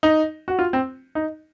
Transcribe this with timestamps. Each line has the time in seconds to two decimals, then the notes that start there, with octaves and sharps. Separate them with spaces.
0.03 D#4
0.48 F#4
0.59 F4
0.73 C4
1.15 D#4